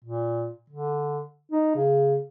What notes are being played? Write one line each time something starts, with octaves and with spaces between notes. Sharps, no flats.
A#2
D3
D#4
C#3